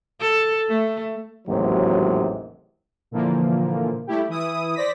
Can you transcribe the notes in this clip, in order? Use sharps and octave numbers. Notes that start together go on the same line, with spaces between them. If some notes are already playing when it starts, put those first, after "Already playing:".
A4
A3
A1 D#2 G#2 C3 F#3
A#2 D3 E3 F3 A#3
G3 A3 E4 G4
E3 E4 D#6
C5 D5 A#6 B6